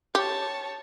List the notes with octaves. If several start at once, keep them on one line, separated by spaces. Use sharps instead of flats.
G4 C#5 A5